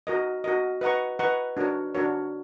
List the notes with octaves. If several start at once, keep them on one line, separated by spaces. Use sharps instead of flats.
F#4 A#4 D#5
F#4 A#4 D#5
B4 D#5 F#5 A#5 C#6
B4 D#5 F#5 A#5 C#6
D4 F#4 A#4 C#5
D4 F#4 A#4 C#5